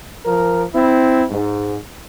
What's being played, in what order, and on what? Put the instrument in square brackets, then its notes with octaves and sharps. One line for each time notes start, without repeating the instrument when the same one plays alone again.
[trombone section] F3 A#4
C4 E4
G#2